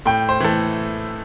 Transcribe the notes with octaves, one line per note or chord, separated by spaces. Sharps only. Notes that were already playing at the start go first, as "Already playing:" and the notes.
A2 G5
C5
E3 A3 A4